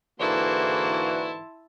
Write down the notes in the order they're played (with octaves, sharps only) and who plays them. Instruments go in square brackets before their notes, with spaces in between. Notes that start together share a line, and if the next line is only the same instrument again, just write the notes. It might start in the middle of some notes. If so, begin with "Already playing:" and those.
[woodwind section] G#2 D3 E3 [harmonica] A#3 F#4 [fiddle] E4 [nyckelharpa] A5 C6